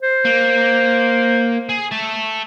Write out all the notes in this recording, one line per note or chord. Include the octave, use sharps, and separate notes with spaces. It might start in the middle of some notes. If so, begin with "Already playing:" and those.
C5
A#3
G#4
A4 E5